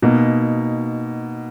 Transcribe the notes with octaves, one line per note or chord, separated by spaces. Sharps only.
B2 A#3 D#4